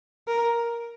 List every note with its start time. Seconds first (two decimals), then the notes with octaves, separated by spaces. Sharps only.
0.28 A#4